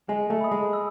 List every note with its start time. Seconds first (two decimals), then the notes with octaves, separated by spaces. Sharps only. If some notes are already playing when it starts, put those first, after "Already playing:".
0.09 G#3 G#5
0.30 A3
0.41 B5 D#6
0.51 G#3
0.73 E6